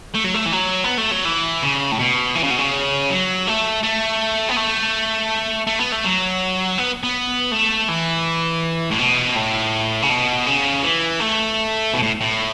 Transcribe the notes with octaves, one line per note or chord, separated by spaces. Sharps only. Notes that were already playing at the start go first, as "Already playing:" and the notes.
A3
F#3
A3
E3
F#3
B3
A3
F#3
E3
C#3
A2
B2
E3
C#3
B2
C#3
F#3
A3
A3
B3
A3
A3
B3
A3
F#3
B3
B3
A3
E3
A2
B2
A2
C#3
B2
C#3
E3
A3
B2
A2
A2